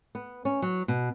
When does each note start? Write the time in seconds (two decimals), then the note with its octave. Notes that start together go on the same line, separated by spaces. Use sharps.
0.15 B3
0.45 C#4
0.62 F#3
0.88 B2